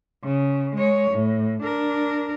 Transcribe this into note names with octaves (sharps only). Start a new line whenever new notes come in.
C#3
G#3 C#5
A2
D4 A#4